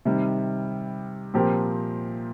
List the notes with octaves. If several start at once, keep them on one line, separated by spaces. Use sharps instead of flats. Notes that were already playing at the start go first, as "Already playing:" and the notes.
C3 D#3 G3
A#2 F3 C4 G4 A#4